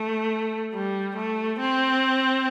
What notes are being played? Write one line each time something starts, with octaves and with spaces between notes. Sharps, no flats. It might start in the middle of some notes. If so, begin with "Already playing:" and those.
Already playing: A3
G3
A3
C4